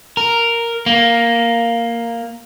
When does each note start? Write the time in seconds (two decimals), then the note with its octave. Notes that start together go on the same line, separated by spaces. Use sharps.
0.17 A#4
0.86 A#3